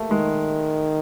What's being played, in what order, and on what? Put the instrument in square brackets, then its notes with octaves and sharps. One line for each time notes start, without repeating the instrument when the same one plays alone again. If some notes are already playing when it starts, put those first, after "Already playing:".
Already playing: [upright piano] A3 A#3
[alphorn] D#3 [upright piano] G#3